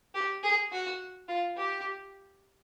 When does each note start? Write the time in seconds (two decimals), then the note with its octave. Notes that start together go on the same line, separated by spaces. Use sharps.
0.15 G4
0.43 G#4
0.72 F#4
1.28 F4
1.57 G4